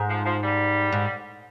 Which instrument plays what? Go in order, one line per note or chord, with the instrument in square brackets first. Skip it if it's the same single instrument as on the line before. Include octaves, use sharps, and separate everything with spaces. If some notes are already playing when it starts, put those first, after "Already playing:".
Already playing: [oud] G#2
[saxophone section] F3
F3
G3
[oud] G#2